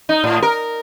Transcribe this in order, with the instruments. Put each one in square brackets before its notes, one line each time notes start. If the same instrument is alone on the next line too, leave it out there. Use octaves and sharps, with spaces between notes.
[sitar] D#4
A2
A#4